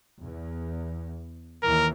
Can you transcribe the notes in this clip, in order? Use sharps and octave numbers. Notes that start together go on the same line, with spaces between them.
E2
D#2 E3 A#4